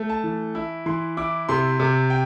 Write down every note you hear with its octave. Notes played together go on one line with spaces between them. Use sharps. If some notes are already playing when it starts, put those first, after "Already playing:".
Already playing: A3
A5
E3
E4
E3 C6
E4 D6
C3 C6
C3
G5